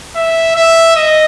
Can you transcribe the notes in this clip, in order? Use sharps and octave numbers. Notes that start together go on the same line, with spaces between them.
E5
E5
D#5